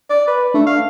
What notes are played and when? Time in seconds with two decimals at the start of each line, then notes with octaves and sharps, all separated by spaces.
0.10 D5
0.27 B4
0.54 A3 D4
0.66 F5